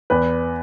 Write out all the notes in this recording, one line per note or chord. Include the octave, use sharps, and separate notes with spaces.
E2 B4